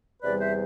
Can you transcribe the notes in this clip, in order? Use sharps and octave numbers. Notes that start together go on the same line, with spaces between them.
E2 C3 G3 B4 D5
C5 E5